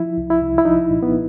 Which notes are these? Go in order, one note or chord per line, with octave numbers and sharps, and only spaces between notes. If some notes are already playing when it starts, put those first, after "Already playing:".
Already playing: F3 E4
C2
E4
C2
E4
F3 D#4
A#2
B3